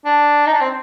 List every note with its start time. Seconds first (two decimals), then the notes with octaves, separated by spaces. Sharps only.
0.05 D4
0.46 D#4
0.54 D4
0.61 C4